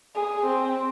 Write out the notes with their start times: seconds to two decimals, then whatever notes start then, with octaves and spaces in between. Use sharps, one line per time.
0.15 G#4
0.45 C4